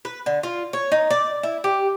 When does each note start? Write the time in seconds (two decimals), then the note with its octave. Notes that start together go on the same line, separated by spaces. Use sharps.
0.05 B4
0.26 D3
0.43 F4
0.73 C#5
0.92 D#4
1.10 D5
1.43 E4
1.64 G4